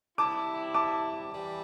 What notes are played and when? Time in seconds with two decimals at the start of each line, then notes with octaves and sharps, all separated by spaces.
0.18 C3 G3 E4 A5 D6
0.74 A5 D6
1.31 E3 G3